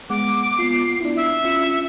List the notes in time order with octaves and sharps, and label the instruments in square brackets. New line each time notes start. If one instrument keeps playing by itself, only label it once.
[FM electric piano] G#3 B3 F#5 [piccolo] D6
[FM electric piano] B3 F4 [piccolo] C7
[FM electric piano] D4 E4
[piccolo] E5
[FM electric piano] C#4 F4 C#7